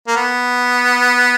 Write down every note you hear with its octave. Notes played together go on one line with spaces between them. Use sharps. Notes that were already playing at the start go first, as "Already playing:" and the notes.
A#3
B3